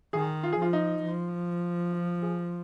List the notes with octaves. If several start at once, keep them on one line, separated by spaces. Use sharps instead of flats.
D#3 G#4
F4
G#4
F3 F4
D#4
F3
F4
G#4